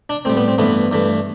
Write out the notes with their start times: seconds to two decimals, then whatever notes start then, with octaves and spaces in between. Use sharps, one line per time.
0.10 D4
0.25 A2 G3 C4
0.37 B3
0.48 C4
0.58 G2 E3 A3 B3
0.91 G2 E3 A3